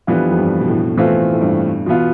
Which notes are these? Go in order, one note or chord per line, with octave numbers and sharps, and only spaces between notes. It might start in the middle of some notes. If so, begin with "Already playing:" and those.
F2 E3 G3 B3 D4 F4
F2
G2
B2
A2
B2 E3 A3 C4 F4
A2
G2
E2 B2 B3 F4